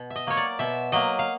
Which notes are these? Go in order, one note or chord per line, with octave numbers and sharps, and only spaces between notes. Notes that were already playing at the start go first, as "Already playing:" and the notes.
Already playing: B2
E5
D#5
F#3 A#3 C#5
D5
B2 E5
F#3 A#3 D#5
F5